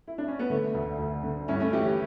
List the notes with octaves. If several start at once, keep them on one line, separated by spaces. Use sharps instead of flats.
E4
D4
C#4
B3
D3 A3
D2
D2
D3
G2 C#4 E4
A3 C#4
E3 E4 G4